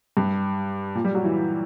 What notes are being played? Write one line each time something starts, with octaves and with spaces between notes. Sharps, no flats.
G2
A#2
G3
F#3
E3